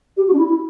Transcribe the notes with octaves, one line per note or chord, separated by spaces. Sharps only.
G4
F#4
D4
E4
E4